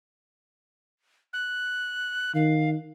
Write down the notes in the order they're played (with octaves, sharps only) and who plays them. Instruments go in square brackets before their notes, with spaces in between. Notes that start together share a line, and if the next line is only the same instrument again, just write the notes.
[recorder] F#6
[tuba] D#3 [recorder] F5